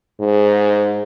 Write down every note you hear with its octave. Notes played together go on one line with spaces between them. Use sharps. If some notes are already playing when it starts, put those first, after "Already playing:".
G#2